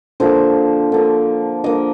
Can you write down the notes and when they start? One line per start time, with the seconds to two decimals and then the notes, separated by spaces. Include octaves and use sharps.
0.20 D3 F3 A#3 C5
0.92 D3 F3 A#3
1.64 D3 F3 A#3 D#5